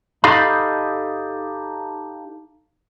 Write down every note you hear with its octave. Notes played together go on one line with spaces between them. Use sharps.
D#4 G4 A4 D#5 F5 B5